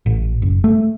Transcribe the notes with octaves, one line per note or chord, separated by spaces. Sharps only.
A1
F#1
A3